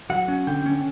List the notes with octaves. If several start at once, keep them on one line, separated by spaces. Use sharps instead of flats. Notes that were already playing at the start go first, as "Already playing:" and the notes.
F#3 F#5
C#4
D3 G5
C#4